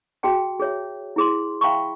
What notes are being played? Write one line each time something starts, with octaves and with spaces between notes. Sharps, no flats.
F#4 G#4 G5 A5
G#4 C#5 E5
E4 G#4 C6
E5 F5 G5 A5 B5 C#6